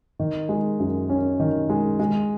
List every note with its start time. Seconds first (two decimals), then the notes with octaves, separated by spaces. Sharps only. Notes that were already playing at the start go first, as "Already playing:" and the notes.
0.19 D#3
0.49 G#3
0.79 F#2
1.10 C#4
1.40 D#3
1.70 G#3
2.00 G#3